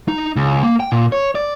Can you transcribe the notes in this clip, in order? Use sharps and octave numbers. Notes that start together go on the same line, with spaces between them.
D#4
C#2
A#3
G5
A#2
C#5
D5